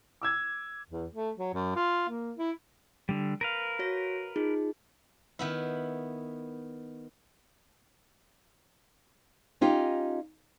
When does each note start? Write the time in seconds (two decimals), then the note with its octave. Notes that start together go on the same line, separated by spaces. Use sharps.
0.21 D6 E6 G#6
0.90 E2
1.15 A3
1.38 F#3
1.54 F#2
1.75 F4
2.09 A#3
2.37 E4
3.09 D3 G3
3.41 A#4 B4 F5
3.79 F#4 C#5 A#6
4.36 D#4 F4 G#4
5.39 D#3 B3 E4
9.61 C#4 D#4 F4 G4